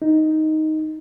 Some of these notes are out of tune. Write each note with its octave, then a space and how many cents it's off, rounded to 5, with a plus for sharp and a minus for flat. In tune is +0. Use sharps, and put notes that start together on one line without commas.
D#4 +5